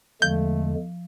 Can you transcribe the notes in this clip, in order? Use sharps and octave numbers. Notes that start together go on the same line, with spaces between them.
E2 D3 F3 G#3 A3 G6